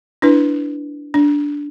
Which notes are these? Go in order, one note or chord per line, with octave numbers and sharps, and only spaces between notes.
D4 E4 B4
D4